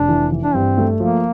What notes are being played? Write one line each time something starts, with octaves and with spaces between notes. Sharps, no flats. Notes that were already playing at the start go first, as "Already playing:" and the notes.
Already playing: F1 D4
E3
E3
D4
G2 C4
A3
F3 A#3